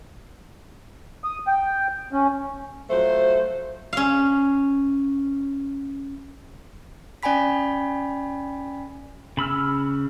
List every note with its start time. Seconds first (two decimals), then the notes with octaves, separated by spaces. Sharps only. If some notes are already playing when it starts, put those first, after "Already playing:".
1.24 D#6
1.47 G5
2.13 C#4
2.90 F3 F#3 A3 C5
3.93 C#4 F5
7.23 C#4 D5 G5 G#5 B5 B6
9.37 C#3 B5 E6 F6